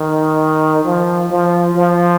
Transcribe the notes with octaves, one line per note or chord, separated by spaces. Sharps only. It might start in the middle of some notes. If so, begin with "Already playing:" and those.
Already playing: D#3
F3
F3
F3